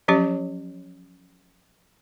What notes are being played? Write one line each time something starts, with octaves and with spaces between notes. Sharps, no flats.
F3 F#3 C#4 G4 C#5